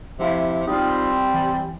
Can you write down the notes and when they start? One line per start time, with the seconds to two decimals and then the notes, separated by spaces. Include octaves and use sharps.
0.19 F2 C3 E4 F5
0.67 G3 C4 D#4 F4
1.34 E3